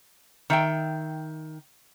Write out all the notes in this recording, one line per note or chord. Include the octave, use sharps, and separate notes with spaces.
D#3 E5 G5